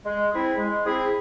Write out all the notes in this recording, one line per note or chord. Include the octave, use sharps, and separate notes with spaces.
G#3
C4 E4 G#4
G#3
C4 E4 G#4